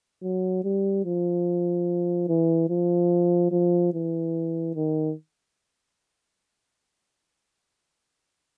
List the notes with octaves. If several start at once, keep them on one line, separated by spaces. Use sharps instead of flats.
F#3
G3
F3
E3
F3
F3
E3
D#3